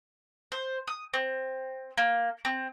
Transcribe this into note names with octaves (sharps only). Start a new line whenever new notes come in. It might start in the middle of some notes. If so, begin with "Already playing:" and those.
C5
D#6
C4
A#3
C4